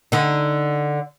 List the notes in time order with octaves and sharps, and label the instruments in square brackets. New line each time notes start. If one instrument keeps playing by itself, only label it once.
[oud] D3 D#4